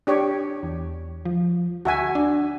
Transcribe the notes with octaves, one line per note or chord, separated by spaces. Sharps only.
D4 G4 C#5
E2
F3
D2 F#4 E5 G#5
D4